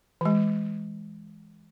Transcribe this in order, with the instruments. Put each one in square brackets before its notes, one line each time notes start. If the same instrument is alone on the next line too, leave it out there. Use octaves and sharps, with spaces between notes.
[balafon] E3 G#3